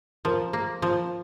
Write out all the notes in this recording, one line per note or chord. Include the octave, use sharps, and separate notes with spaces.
F3 A#4
A#3
F3